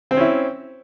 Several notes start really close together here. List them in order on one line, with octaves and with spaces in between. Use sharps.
C4 C5 C#4 E4